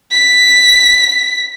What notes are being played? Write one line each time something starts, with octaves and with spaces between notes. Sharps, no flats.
B6